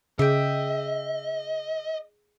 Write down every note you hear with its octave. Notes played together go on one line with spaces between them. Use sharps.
C#3 G#4 D#5 E5 G5